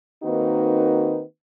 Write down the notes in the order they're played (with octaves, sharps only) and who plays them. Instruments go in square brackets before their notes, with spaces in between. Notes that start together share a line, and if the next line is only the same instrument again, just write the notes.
[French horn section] D#3 A#3 C4 D#4 F#4 B4